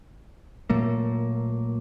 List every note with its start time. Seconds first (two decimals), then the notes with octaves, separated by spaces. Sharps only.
0.70 A#2 F#3 A3 A#3